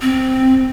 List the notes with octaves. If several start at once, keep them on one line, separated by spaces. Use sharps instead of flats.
C4